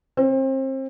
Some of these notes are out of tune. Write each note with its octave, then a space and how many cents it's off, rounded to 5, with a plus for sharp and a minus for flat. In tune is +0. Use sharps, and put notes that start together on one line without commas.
C4 +30